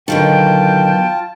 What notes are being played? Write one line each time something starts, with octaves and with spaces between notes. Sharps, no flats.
B2 D3 D#3 F#3 F4 G5 A5